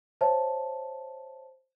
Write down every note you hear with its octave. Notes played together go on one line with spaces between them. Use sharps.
C5 C#5 E5 A5